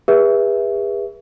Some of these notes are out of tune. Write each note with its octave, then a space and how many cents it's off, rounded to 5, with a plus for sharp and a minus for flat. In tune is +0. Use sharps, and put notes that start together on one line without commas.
G#4 -40 B4 -30 E5 +0